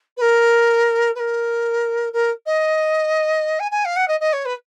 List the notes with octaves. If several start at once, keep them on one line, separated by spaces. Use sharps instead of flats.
B4
A#4
B4
A#4
A#4
D#5
G#5
G#5
F5
F#5
D#5
D#5
C#5
B4